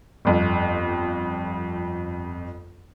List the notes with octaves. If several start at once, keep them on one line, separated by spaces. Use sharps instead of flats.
G1 F2